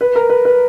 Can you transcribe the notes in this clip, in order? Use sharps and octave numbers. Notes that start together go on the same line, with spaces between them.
B4
A#4
B4
B4